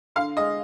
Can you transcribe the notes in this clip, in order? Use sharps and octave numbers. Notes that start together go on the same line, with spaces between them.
D3 F5
G#3 D#5